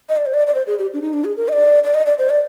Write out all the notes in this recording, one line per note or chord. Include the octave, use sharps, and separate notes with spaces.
D#5
D5
C5
D5
D5
C5
G#4
G4
D4
D#4
D4
G#4
A#4
D#5
D5
D5
D#5
D5
C5
D5